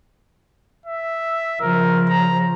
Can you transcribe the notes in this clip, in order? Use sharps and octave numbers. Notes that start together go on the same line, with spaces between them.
E5
C#3 F3 A#4
A#5